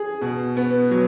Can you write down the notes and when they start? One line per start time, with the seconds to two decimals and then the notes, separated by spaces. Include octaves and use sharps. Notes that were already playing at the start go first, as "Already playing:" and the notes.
Already playing: G#4
0.21 B2
0.57 B3
0.91 F#3